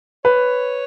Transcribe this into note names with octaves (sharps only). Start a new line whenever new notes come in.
B4 C#5